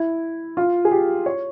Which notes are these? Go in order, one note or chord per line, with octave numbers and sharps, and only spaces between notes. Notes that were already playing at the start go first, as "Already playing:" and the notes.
Already playing: E4
F4
G#4
G4
C#5